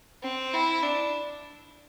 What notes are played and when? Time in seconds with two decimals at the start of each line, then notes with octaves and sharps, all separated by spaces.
0.23 C4
0.53 E4
0.83 D4